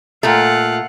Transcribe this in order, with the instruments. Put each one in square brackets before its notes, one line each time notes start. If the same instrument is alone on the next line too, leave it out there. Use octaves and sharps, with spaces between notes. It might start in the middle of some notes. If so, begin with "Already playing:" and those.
[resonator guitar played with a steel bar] A#2 A3 [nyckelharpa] F5 F#5